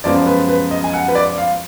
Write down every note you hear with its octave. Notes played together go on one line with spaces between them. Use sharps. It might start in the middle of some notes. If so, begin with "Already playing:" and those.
F#2 F3 G#3 B3 D5
B4
B4
D#5
G#5
F#5
B4
D5
F5